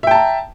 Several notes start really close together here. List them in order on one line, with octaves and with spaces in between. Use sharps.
E5 G5 A5 A#5